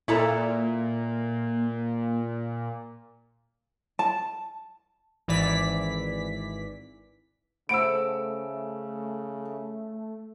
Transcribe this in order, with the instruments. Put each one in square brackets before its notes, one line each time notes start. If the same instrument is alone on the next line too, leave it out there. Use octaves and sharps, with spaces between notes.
[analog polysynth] A#2 [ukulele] E4 A4 A#5
[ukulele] A5
[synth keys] G#1 E3 D5 B6
[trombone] C#3 [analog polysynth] A3 [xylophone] C5 F#5 B5 [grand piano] E6 D7